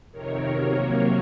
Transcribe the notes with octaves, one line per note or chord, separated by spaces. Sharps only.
F2 C3 D#3 A#4 C#5
C3 F#3 A#3